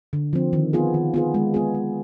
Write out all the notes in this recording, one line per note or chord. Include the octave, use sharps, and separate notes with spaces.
D3
F3 C4
D#3
B3 F4 G#4
D#3
B3 F4 G#4
G#3
B3 F4 G#4
G#3